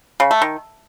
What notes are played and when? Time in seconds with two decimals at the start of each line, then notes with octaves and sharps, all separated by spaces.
0.20 C#3
0.31 A3
0.42 D#3